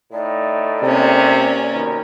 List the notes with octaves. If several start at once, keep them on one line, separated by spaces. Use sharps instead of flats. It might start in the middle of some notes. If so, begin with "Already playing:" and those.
A2 A3 D#4 D5
C3 A#3 C#4
B2 D#3 A#4